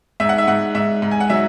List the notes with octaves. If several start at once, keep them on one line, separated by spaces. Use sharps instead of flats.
G#2 E5
F#5
E5
G#2 F#5
G#2 E5
G#2
G#5
F#5
F#3 E5